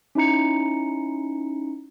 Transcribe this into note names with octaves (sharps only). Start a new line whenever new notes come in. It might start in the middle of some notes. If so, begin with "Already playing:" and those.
C#4 D#4 E4 A#5 C#7